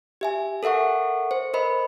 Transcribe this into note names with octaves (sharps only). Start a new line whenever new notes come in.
G4 E5 G#5
A4 A#4 E5 F#5 C#6
C5
A#4 C5 D#5 B5